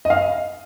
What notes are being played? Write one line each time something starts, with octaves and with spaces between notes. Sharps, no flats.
D#5
F5